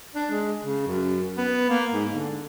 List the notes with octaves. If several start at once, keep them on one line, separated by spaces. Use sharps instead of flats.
D4
G#3
C#3
F#2
B3
A#3
G#2
D3